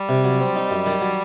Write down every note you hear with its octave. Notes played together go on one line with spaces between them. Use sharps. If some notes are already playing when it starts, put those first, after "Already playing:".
Already playing: G3
C3
F#3
C4
D#4
F#2
D#3
F#3